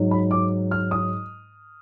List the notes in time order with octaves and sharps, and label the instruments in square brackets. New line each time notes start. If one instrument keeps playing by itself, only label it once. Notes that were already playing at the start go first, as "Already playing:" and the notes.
Already playing: [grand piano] G#2 F#3
B5
D6
F6
D#6